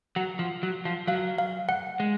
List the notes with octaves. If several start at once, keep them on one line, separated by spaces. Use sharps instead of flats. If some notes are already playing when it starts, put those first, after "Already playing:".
F#3 F#5
F3
F#3
F3
F#3 F5
F5
F#5
G#3